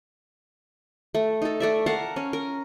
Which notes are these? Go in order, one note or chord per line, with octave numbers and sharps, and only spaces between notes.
A3
D#4 A4
A3 D5 E5
A#4 F5 F#5 A5
C#4
A#4